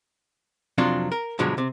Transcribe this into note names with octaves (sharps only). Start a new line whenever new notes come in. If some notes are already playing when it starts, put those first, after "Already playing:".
F2 C3 F#3 D4 F4
A#4
G2 B2 D3 F3 F#3 G#3
C3